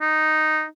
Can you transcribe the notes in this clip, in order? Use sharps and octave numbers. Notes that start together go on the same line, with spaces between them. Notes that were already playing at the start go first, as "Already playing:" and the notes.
D#4